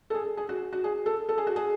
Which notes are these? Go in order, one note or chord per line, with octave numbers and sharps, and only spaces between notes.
A4
G#4
G#4
F#4
F#4
G#4
A4
A4
G#4
F#4
G#4